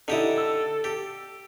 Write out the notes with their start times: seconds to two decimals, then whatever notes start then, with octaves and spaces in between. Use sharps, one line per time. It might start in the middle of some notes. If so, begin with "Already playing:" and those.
0.08 D3 D#4 E4 G4 A4 D#6
0.38 E6
0.84 G4